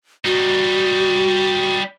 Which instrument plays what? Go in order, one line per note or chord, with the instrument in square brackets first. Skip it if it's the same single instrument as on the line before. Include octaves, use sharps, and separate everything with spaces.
[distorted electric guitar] G3 D#4 [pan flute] F#4